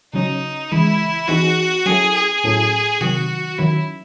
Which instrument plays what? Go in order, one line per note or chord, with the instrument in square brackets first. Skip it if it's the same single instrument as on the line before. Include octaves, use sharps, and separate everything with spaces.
[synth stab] C#3 F#3 C#4 [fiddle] D#4
[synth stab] C#3 E3 G#3 [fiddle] E4
[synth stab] E3 C4 D#4 G#4 [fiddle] F#4
[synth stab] F#3 C#4 E4 A4 [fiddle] G#4
[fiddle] G#4
[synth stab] A2 F#3 C#4 E4 A4
[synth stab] C3 D#3 F#3 [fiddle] F#4
[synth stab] D#3 F#3 C#4 [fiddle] E4